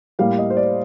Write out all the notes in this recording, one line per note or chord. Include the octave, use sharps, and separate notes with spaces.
A2 G3 A#3 F5
D#5
C5
D5